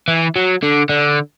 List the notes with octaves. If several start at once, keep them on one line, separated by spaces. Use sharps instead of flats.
E3
F#3
D3
D3